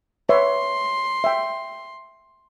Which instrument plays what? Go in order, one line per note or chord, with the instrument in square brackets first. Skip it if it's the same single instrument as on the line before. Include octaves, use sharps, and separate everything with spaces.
[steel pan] B4 C#5 E5 [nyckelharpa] C6
[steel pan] E5 G5